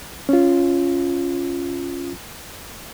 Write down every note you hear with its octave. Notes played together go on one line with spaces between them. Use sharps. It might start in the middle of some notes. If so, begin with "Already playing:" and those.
C#4 F4